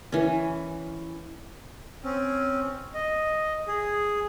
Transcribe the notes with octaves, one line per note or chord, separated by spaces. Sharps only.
E3 C#4
C4 C#4
D#5
G#4